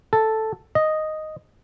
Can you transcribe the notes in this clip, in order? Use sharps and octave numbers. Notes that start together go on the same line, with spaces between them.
A4
D#5